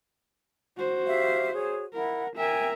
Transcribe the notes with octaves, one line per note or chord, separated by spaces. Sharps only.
F#4 C5
G4 E5 F5
G#4 C#5
E4 A#4 F#5
A#4 E5 G5 G#5